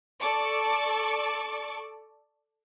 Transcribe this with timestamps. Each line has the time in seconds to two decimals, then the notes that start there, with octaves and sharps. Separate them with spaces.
0.19 A4 D5 A5 C#6 D6